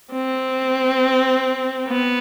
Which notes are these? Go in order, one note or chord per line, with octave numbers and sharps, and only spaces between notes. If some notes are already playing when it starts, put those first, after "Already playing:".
C4
B3